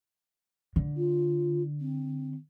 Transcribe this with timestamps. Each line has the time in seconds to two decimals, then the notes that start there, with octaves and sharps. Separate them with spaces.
0.76 D3
0.97 F4
1.80 C4